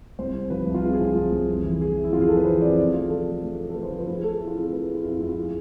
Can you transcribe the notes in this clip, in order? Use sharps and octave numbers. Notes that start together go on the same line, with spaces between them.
C2 C5
C3
F3 B4
C2
F4
C3 G#4
G#4
F3
F4
C2
C2
F2
E3
E3 G#4
E3
E4
F2 F4
G#4
F2 A4
B4
E3 C5
F2 D5
C3 D5
A3 F4
F3 A4
A3
A3
A3
A4
A3 B4
C5
F3 F4
B4
A3 F4
G#4
A3 A4
A3 E4
F4
C4 G#4
A4
A3 B4
G#4
C4
F4
F2 E4
F4
F2 E4
F4
G#3
G#4